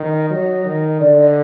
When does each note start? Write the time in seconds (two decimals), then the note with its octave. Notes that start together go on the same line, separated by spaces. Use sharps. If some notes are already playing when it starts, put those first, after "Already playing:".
Already playing: D#3
0.12 D#5
0.29 F#3 D#5
0.65 D#3
1.00 D3 D5
1.18 D#5